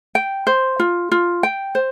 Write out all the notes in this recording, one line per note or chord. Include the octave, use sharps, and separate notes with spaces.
G5
C5
F4
F4
G5
C5